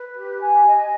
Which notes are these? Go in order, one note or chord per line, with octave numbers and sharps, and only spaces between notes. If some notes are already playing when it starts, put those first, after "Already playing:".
Already playing: B4
G4
G#5
D#5